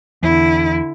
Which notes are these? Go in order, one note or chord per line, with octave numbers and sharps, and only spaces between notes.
E2 D3 E4